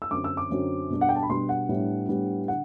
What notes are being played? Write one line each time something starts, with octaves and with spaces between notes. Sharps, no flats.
E6
F#2 D3 F#3 C4 D6
E6
D6
F#2 D3 F#3 C4
B2 G3 D4
F#5
G5
A5
B5
B2 G3 D4 C6
F#5
A2 G3 B3 D4
A2 G3 B3 D4
D3 F#5